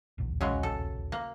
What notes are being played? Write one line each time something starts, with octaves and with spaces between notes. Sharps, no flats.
D#1 B1 E2
C#3 F#3 G#3
A4
A#3